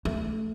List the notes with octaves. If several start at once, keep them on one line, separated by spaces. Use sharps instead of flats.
A3